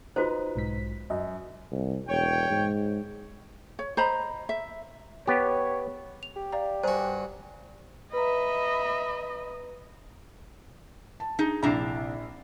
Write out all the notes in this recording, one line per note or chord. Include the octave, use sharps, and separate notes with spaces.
D#4 F4 F#4 B4 C5
B1 G#2 B6
F#2 D#5
C2
E1 C#5 G5
G#2
C#5
C5 D#5 A#5 B5
E5
B3 G4 C#5
F7
G4
D5 F5 A#5
G2 F#4 C5 G#5 A#5
B4 D#5 E5 A#5 B5
A5
D#4 G#4
A#1 C3 D4 E4 A#5 C7